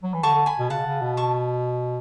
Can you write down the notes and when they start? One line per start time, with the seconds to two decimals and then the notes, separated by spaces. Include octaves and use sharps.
0.03 F#3
0.14 E3
0.23 D3 A5 C#6
0.35 D3
0.46 G#5 B5
0.59 B2
0.70 C#3 F#5 A5
0.86 C#3
1.02 B2
1.17 A5 C#6